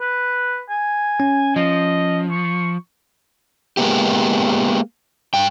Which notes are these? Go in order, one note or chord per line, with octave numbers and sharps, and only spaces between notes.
B4
G#5
C#4
F3 D#5
C#6
G#3 A#3 B3 G4
G2 G5